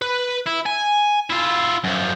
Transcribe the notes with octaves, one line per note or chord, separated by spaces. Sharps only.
B4
E4
G#5
E4 F4
F#2 F3